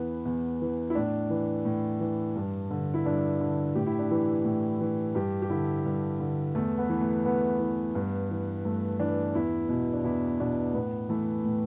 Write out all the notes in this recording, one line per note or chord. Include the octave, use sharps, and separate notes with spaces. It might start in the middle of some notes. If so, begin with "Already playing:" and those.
Already playing: E2 E3 B3
E2
E3
E4
A2 D4
E3
A2
E3
G2
D3
E4
G2 D4
D3
A2 G4
E4
D4
E3 E4
A2
E3
G2 G4
G4
D3 E4
G2
D3
E2 A3
B3
E3
A3
E2 B3
E3
G2
E3
G2 A3
E3 D4
E2 E4
B2
D4
E2 E4
B2 D4
A2 B3
E3 A3
A2